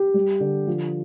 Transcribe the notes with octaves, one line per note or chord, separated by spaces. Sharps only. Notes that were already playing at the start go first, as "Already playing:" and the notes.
Already playing: G4
G3
D3
F3